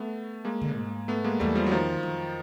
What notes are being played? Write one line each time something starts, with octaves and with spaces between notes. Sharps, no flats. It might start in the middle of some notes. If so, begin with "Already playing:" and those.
Already playing: A3 B3
G#3 A#3
D3
G#2
A3 B3
G#3 A#3
E2 G3 A3
F3 G3
F#3
D#3 F3
F2